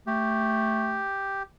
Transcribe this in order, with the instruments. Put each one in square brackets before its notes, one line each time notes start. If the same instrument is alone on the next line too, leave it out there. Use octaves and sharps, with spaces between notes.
[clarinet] A3 [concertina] G4